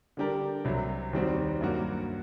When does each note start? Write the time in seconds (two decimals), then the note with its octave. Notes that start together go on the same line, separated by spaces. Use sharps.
0.17 D3 G3 D4 G4 A#4
0.65 C2 C3 F#3
1.13 D#2 D#3 G3 C4 F#4
1.61 G2 F#3 A#3 F#4